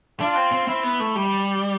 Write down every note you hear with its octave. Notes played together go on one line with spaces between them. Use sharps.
D4 F4
C4
C4
C4 E4
B3
A3
G3